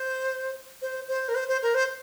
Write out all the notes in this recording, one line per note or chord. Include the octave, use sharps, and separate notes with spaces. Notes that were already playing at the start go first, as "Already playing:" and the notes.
Already playing: C5
C5
C5
A#4
C5
C5
A#4
C5